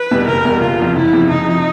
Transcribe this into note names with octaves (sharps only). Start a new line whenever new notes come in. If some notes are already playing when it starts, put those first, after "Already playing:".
Already playing: B4
E2 B2 G3
F#1 A#4
E2 B2 G3
F#1 F4
E2 C3 F3
F#1 E4
E2 C3 F3
F#1 D#4
C3 F3